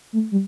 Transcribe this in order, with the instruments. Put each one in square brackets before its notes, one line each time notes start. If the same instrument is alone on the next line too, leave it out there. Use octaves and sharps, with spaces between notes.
[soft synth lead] A3
G3